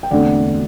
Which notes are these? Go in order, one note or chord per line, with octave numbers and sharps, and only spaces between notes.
G5
E1 D2 D3 A3 C4 D5 F#5